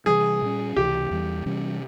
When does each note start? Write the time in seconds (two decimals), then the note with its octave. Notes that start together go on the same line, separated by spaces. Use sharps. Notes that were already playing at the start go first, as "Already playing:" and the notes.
0.06 C3 E3 G3 G#4
0.42 A#2 G3 C#4
0.76 C#2 C3 E3 G4
1.11 E2 E3 G3
1.46 C3 E3 G3 C#4